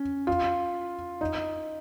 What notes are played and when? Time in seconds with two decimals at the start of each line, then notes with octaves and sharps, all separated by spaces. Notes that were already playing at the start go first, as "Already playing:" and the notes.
Already playing: C#4
0.27 F4
1.21 D#4